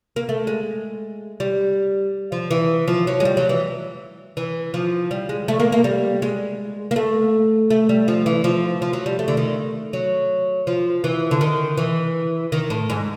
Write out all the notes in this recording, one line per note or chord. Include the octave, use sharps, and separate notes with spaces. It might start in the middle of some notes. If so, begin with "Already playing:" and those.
A#3
A3
G#3
G3
F3
E3
F3
F#3
G#3
G3
F#3
E3
E3
F3
G3
G#3
A3
A#3
A#3
G3
G#3
A#3
A3
A3
G3
F3
E3
F3
F3
F#3
G3
A3
D3
D#3
F#3
F3
E3
D3
D#3
E3
D#3
A2
G#2